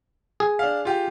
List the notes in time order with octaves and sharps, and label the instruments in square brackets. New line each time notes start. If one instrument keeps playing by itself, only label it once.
[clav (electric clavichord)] G#4
[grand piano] D4 F5
F4 G4